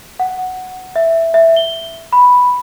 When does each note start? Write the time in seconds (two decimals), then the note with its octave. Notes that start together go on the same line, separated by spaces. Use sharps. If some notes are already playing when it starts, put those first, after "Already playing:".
0.20 F#5
0.96 E5
1.34 E5
1.56 G7
2.13 B5